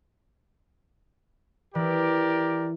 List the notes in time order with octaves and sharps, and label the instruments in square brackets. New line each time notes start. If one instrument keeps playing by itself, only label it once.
[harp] E3 E4 [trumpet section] G4 A#4 D5